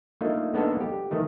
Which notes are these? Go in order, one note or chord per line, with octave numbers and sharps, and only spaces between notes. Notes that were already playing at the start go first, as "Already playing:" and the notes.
A3 A#3 D4 D#4 F4
A#3 B3 D4 D#4 A4
G4
D#3 E3 A3 D#4